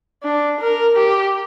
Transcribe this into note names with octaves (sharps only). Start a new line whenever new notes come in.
D4
A#4
G4